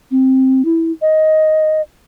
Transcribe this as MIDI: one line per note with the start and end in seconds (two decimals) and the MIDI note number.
0.11 0.64 60
0.65 0.91 64
1.01 1.81 75